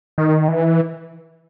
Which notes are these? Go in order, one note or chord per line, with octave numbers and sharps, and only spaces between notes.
D#3
E3